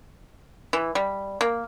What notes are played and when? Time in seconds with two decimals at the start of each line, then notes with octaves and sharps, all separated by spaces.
0.73 E3
0.95 G3
1.41 A#3